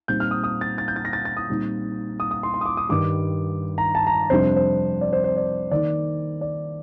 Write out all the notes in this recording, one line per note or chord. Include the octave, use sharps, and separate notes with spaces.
A#2 G3 C4 D#4 G6
F6
D#6
D#6
A6
A6
G6
A6
A#6
A6
A6
D#6
A#2 G3 C4 D#4
D#6
D#6
C6
C6
D#6
D6
D#6
G2 D#3 G3 D6
A#5
A5
A#5
F2 C3 G3 D4 C5
C5
D5
C5
C5
D5
D#3 A#3 D#4 D5
D5